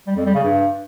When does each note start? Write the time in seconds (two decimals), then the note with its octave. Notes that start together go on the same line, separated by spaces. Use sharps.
0.07 G3
0.16 F2
0.25 G3
0.35 C#3
0.44 G2